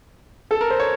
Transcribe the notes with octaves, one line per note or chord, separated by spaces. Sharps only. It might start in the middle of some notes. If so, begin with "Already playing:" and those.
A4
A#4
C5
C#5